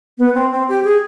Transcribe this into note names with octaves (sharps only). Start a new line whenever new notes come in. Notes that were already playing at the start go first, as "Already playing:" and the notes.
B3
C4
C4
G4
G#4